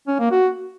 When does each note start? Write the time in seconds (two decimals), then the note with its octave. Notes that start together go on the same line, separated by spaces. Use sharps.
0.08 C#4
0.19 A#3
0.31 F#4